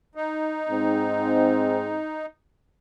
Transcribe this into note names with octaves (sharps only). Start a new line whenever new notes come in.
D#4
G#2 C4